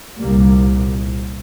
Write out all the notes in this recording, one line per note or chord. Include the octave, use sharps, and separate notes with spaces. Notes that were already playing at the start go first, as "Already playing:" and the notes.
C2 A#2 G3 A#3